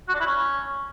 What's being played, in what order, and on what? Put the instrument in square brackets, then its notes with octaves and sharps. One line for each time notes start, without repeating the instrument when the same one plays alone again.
[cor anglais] F#4
D4
E4
C#4